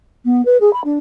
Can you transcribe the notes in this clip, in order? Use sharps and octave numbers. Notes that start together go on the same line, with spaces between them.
B3
B4
G#4
B5
D4